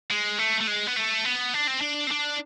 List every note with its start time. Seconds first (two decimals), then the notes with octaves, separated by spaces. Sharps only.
0.11 G#3
0.39 A3
0.60 A3
0.67 G#3
0.87 B3
0.96 A3
1.25 B3
1.54 D4
1.67 C4
1.81 D4
2.07 C4
2.11 D4